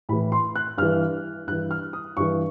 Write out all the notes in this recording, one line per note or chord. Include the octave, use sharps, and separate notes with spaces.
A2 E3 B5
C6
F#6
G2 E3 F6
G2 E3 F#6
F6
D#6
G2 E3 C#6